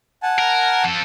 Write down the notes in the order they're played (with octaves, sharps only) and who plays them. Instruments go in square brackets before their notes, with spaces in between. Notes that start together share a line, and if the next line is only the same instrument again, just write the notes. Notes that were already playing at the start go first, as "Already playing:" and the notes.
[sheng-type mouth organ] F#5 G#5 A5
[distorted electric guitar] A#4
F3 A4